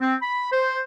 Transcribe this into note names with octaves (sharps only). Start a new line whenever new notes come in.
C4
B5
C5